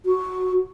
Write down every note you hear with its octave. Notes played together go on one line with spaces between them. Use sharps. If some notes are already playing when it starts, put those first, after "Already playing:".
F#4